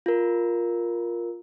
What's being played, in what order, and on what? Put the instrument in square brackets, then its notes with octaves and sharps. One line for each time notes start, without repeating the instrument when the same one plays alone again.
[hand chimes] F4 A#4